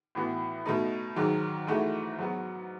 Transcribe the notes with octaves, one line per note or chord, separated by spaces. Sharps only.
A2 E3 B3 F#4
B2 A3 D#4
G#2 D#3 F#3
G#2 E3 A3 D#4 F#4
G#2 F#3 B3 F#4